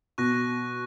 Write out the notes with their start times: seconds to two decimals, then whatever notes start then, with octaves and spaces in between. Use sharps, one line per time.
0.18 B2 C#6 F#6 A#6